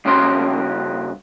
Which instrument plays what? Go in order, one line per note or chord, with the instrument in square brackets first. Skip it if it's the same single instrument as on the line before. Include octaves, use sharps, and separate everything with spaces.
[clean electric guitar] G2 C#3 C#4 F#4 C6